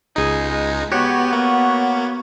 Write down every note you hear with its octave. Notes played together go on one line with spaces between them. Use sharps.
C#2 D#4 G#4
G#3
B3 F#4 G4 C#5
A#3